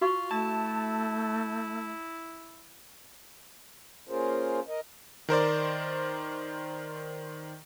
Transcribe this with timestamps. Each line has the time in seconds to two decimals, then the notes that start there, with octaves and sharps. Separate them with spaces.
0.01 F4 F#4 F5 C#6
0.31 A3 E4 A5
4.09 A#3 C#4 F4 G#4 A#4 C5
4.68 A#4 D#5
5.29 D#3 A#4 C5 D5